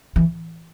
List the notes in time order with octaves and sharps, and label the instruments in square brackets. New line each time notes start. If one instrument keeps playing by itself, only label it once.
[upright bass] E3